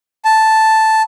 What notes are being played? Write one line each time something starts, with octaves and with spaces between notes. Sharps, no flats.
A5